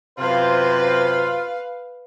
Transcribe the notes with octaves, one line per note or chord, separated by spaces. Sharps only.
F#2 C3 F4 B4 C5 F5